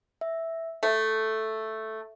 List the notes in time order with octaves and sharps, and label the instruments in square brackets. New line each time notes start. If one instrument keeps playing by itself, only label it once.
[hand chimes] E5
[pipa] A3 [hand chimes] A4